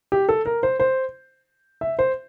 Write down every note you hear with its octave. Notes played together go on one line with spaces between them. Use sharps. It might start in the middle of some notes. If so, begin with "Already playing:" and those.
G4
A4
A#4
C5
C5
E5
C5